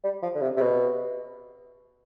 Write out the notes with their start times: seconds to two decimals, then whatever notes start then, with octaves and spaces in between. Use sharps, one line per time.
0.04 G3
0.23 F3
0.35 D3
0.42 C3
0.56 C3
0.61 B2